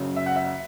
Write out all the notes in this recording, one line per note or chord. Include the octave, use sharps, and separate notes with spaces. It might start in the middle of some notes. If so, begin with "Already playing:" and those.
Already playing: F#1 F#2 C#3
E5
F#5
E5